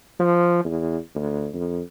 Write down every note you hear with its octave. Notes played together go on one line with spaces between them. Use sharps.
F3
E2
D2
F2